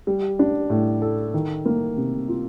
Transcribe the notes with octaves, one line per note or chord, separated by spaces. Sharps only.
G3
D4
A2
A4
D#3
A#3
C3
F4